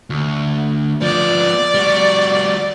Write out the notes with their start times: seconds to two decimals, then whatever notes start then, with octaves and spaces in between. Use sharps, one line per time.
0.10 D2
1.02 F3 B3 D5
1.74 G3 F#4